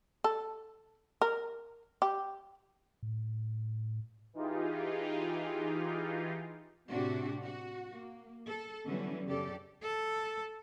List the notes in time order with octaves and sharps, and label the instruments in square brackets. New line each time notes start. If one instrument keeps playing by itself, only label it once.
[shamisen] A4
A#4
G4
[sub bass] A2
[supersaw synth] E3 D#4 F4 G4 G#4
[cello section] A2 C3 C4 D4 F#4 G4
F#4
A#3
A4
D3 E3 F#3 G3 B3 C#4
F#2 C#3 G4 A4 D5
[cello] A4